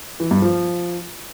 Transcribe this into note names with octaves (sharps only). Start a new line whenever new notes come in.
E3
G2
F3